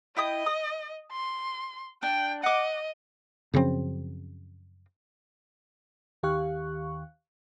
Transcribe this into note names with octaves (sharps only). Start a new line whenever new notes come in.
E4 D#5 G5 D#6
D#6
C6
D4 G5
D#5 F#5 D6
F#2 C#3 F3 C4
D#2 D#3 G4 F5 C#6 F#6